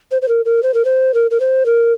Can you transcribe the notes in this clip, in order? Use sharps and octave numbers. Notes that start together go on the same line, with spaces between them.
C5
C5
A#4
A#4
C5
A#4
C5
A#4
A#4
C5
A#4